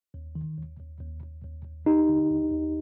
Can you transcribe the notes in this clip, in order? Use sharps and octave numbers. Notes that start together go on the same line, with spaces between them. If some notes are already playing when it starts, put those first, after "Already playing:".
D#2
D#3
D#2
D#2
D#2
D#2
D#2
D#2
D#2 D#4 G4
D3
D#2
D#2